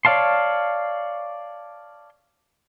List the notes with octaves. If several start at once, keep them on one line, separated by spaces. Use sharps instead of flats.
C#5 D5 F5 A5 C6